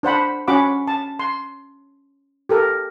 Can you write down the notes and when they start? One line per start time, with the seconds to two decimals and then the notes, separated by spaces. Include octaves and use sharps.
0.03 D4 C5 F#5 B5
0.48 C#4 F#4 F#5 B5 D6
0.87 A5
1.19 C6
2.49 G4 A4 A#4